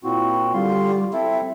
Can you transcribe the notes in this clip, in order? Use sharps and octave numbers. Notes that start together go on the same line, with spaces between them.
A#2 C4 E4 F#4
D3 G3 F4 C6
C4 E4 A4 E5